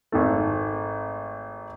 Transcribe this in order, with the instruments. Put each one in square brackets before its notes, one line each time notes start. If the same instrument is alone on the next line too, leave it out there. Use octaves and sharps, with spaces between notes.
[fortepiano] G#1 D#3 A3